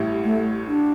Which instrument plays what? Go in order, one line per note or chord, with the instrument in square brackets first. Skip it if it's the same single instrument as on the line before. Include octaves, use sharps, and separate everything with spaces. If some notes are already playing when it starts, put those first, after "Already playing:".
Already playing: [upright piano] A1 A2 G3 E4
[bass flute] A3
D4